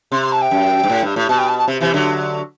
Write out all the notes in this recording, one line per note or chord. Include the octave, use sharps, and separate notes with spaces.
C3 C6
C6
A5
G5
F#2
G2
A2
G2
A2
B2 A5
G5
A5
A5
C3
C3 E3
D3 F#3